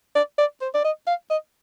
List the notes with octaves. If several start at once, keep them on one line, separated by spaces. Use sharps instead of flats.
D5
D5
C5
D5
D#5
F5
D#5